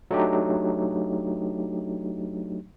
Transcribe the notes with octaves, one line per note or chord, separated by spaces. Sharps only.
F#3 A3 D4 D#4 G4